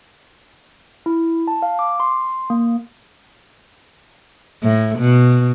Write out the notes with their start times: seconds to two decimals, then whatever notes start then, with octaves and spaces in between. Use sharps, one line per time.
1.06 E4
1.48 A5
1.62 F5
1.79 D6
2.00 C6
2.50 A#3
4.63 A2
4.98 B2